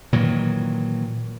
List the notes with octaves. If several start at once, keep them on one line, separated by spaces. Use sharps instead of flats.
A#2 D#3 E3 F#3